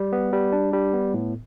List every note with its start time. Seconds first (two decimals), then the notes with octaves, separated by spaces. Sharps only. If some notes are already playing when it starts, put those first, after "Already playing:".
Already playing: G3
0.13 B3
0.33 G3
0.52 D4
0.73 G3
0.93 B3
1.14 A2